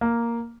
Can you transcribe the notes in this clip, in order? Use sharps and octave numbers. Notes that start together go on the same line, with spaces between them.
A#3